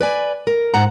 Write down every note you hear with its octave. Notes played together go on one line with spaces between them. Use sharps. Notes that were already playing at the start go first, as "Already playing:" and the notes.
B4 D5 G#5
A#4
G#2 F#5 A#5